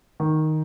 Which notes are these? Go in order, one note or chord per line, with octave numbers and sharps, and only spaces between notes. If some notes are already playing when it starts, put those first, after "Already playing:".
D#3